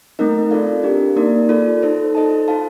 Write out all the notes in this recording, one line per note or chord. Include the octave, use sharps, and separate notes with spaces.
A3 C4 D#4 A#4 D#5
C4 F4 A4 D5 F5
D4 G4 A#4
A#3 D#4 A#4 D5
F4 A4 D5
D#4 A4 C5
D#4 A4 C5 D#5 A5
F4 C5 F5 A5